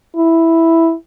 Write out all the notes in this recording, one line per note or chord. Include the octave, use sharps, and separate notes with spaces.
E4